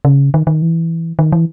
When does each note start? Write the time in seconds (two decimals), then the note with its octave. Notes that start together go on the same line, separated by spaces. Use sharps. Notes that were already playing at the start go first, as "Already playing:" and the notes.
0.05 C#3
0.34 D#3
0.47 D#3
0.62 E3
1.19 D#3
1.32 E3